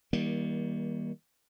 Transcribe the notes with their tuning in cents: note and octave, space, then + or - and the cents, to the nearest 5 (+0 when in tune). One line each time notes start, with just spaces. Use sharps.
D#3 +35 G3 +0 A#3 +25